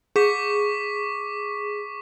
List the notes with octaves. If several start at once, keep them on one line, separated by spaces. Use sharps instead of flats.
G#4 C#6 D6 B6